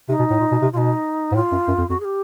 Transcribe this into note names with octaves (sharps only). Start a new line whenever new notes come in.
C3 D#4
B2
A2
A#2
B2
C3
B2 D#4 F4
G#2
A2 F4
F#2
F#2
F2
F2 F#4
G#4
G4